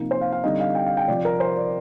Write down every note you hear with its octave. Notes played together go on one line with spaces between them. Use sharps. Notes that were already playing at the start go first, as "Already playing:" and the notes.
Already playing: C3 F3 A#3 D#4
C5
F5
F5
D3 G3 C4 D#4 D#5
F5
G5
F5
G5
C3 F3 C4 D5
A#4
C5
D5